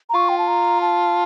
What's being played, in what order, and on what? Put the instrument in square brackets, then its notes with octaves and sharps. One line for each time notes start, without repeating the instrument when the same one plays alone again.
[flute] A#5
[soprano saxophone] F4 [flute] C#6
[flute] G5
A5
A#5
A5